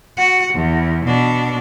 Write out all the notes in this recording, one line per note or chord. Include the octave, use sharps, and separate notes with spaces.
F#4 F#5
E2
B2 D4